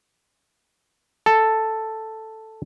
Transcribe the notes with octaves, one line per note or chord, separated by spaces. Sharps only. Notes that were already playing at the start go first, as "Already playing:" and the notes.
A4